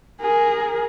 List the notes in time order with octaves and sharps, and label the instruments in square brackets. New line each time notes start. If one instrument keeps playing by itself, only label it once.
[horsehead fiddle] G#4 A#4